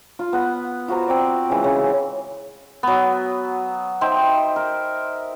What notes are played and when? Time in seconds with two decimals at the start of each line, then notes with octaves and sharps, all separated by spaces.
0.19 F4
0.33 B3 F#5 B5
0.88 F4 F#4 C5 A#5
1.08 C4 D5
1.50 C#3 E3 G#3
1.64 C#3
2.83 F#3 B3
4.01 D#4 C5 E5 G5
4.56 A#4